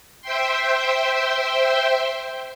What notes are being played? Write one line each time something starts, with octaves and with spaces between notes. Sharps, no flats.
C5 E5 G5 C6